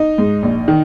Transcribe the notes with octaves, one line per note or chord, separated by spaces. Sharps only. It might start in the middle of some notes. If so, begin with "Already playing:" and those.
Already playing: D#4
G#2
A#1
D#3